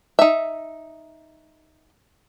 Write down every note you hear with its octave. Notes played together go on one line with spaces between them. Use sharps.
D#4 E5